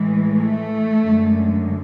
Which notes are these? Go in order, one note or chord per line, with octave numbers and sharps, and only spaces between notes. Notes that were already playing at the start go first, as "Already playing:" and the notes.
Already playing: A2 E3 G#3
A3
F#2 D3 G#3